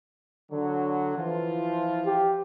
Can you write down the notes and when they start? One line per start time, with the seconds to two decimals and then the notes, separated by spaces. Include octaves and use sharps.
0.52 D3 F#3
1.18 E3 F3 F4
2.06 G4